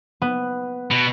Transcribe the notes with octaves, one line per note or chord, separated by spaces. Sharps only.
B3
B2